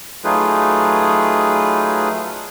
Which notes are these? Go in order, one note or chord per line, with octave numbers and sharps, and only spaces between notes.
F#3 A3 D#4 F4 G#4 B4